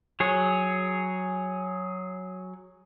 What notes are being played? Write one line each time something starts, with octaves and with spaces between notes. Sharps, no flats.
F#3 G#4 C#5